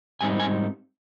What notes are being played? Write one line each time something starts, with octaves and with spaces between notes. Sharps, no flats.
G#2 G3 C4 D#4 G#5
G#5